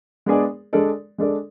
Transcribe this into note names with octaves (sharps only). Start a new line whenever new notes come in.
G#3 B3 D4 G#4 D5
G#3 D4 A4 D5
G#3 D4 A4 D5